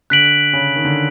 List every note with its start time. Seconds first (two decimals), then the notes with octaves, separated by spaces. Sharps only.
0.10 D3 F#6 B6 D7 F#7
0.53 C#3
0.76 D#3
0.85 D3